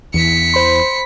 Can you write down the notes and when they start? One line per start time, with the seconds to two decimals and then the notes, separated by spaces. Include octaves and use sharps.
0.14 E2 E3 B6 C#7
0.54 C5 B5 C6